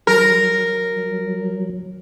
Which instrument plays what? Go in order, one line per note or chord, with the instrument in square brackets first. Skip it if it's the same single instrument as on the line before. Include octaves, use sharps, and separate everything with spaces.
[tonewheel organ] F#3 [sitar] A#4